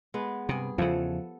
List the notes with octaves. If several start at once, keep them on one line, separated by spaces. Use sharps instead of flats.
G#3 B3 B4
G2 C3 G#4
E2 C#3 F3 A4 F#5